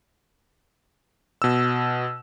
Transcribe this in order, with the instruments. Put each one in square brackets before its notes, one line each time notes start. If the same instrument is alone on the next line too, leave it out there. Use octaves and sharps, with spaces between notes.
[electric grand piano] B2 E6